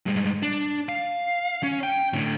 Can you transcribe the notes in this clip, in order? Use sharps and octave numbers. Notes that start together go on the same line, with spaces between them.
G2 G#3
D4
F5
C#4
G5
A2 D3